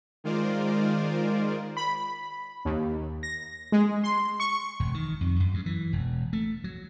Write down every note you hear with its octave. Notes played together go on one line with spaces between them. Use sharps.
D#3 G#3 F4 A#4 C5 D5
B5
D#2
A#6
G#3
C6
C#6
E1
D#3
F2
F#2
G2
E3
E1
A3
F#3